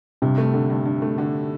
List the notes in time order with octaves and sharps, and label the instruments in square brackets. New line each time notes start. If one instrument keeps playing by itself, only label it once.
[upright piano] G2 [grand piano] C3
[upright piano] A3
D3
G2
G2
A3
D3